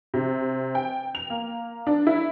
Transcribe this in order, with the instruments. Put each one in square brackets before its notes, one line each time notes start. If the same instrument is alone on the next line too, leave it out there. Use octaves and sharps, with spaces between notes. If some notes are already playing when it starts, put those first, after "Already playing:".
[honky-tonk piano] C3
G5
F7
A#3
D4
E4